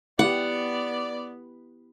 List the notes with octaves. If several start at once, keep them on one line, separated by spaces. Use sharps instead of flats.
B3 E4 G4 D5 F#5